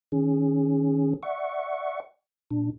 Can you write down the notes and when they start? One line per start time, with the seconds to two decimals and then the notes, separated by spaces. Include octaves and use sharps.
0.12 D#3 C#4 G#4
1.23 D5 E5 F#5 C#6
2.51 A#2 D4